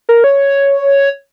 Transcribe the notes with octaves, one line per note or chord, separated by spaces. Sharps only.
A#4
C#5